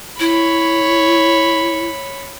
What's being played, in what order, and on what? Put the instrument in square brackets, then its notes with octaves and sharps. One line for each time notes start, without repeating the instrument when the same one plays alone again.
[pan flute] E4 [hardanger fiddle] C#5 B5